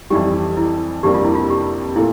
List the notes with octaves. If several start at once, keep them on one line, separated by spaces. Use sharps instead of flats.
F2 E3 G3 G4
E4
F2 C3 G3 A#3 D4 G4
F4
E4
F4
G4
A#2 A3 E4